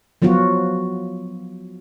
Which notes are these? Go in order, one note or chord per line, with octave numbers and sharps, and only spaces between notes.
F3 F#3 B3 F4 F#4